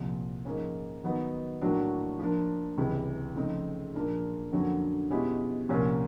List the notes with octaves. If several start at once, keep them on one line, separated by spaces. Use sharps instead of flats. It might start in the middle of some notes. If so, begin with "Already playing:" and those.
Already playing: C2 A#2 F3
G#2 F3 A#3 C#4
D#3 F#3 B3 D#4
A2 F#3 A#3 D4 F#4
F3 A#3 D4
C#2 C3 E3 G3
C#3 F3 A3 C4 D#4
A#2 F3 A#3 D4 F4
F2 D3 F#3 A#3 C#4
B2 G#3 C#4 E4 G4
C2 A#2 F3 A#3 C#4